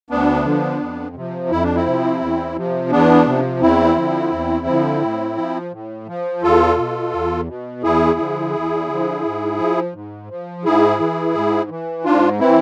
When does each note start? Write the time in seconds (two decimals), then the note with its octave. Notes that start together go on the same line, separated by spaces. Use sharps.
0.10 D2 B3 D4
0.45 D3 F3
0.80 F2
1.16 C3 F3
1.51 F2 E4
1.63 D4
1.76 C4 E4
1.86 C3 F3
2.21 E2
2.56 C3 F3
2.91 E2 B3 D4
3.27 C3 F3
3.61 E2 C4 E4
3.96 D3 F3
4.32 E2
4.67 D3 F3
5.02 A2
5.37 F3
5.72 A2
6.08 F3
6.43 E2 F4 A4
6.78 B2
7.13 E2
7.48 B2
7.83 E2 E4 G#4
8.19 D3 F3
8.54 E2
8.89 D3 F3
9.24 G#2
9.59 F3
9.94 G#2
10.30 F3
10.65 G#2 E4 G#4
11.00 E3
11.35 G#2
11.70 E3
12.05 G#2 D4 F4
12.40 E3 C4 E4